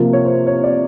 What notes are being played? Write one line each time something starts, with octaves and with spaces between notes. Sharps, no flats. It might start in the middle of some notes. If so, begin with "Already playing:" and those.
Already playing: C3 F3 A#3
C#5
C5
C#5
D5